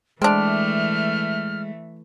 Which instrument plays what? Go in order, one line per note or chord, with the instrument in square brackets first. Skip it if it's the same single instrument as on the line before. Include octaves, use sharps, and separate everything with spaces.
[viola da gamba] E3 A3 [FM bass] G#3 [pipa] C4 D4 [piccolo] F6